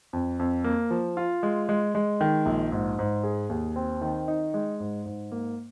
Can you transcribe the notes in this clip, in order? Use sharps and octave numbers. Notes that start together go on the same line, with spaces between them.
F2
F2
A#3
F3
F4
G#3
G#3
G#3
D#3
A#1
G#2
G#2
G#4
D#2
C4
D#3
D#4
G#3
G#2
G#2
A#3